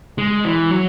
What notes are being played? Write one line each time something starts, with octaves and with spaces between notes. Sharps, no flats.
G#3
E3
F#3